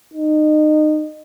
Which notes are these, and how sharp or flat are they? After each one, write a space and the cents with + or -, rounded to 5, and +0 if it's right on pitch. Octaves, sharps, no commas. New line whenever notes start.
D#4 -25